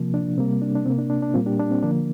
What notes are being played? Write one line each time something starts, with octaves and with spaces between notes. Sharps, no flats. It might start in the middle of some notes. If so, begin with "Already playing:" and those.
Already playing: C3 F3 A#3
D4
C3 G3 A#3 C4
D4
D4
C3 A#3 C4
D4
D4
D4
A#2 G3 A#3 C4 F4
D4 G4
D4
C4
D3 F3 A#3 D4